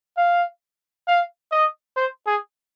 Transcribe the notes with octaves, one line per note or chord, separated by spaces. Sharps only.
F5
F5
D#5
C5
G#4